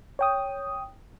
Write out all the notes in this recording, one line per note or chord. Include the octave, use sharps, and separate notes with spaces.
C#5 G5 D#6